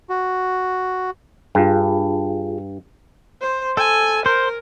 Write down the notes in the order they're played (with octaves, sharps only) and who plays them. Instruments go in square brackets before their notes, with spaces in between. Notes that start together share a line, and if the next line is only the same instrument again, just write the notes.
[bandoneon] F#4
[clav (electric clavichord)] G2 [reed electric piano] F4 G#4
[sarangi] C5
[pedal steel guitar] A4 [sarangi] G#5
[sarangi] A#4 [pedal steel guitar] C5